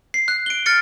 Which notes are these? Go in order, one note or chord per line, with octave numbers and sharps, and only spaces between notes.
C7
F#6
D7 G7
F6 A6 C#7 D7